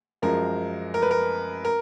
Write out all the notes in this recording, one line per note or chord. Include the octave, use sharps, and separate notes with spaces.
F#2 F3 G#3 A#4
A#4
B4
A#4
A#4